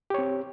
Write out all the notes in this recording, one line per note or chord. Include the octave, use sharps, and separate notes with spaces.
C4 G4 C#5